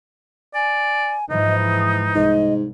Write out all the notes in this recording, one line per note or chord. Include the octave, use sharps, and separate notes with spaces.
D5 G#5
G#2 E3 F3 D#4 D#5
D#6
C2 G#2 D#5